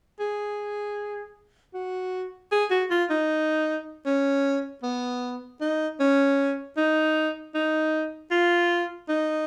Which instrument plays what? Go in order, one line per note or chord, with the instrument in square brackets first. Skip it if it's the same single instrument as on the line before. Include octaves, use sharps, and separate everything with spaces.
[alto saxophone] G#4
F#4
G#4
F#4
F4
D#4
C#4
B3
D#4
C#4
D#4
D#4
F4
D#4